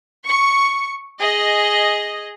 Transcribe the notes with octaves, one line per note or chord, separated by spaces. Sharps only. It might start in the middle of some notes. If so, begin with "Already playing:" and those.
C#6
G#4 D#5